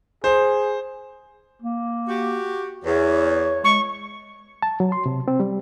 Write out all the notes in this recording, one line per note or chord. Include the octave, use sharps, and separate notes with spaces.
G#4 C5
A#3
F#4 G4
E2 C#5
G#3 C#6
A5
F#3
C6
C3
C4
G3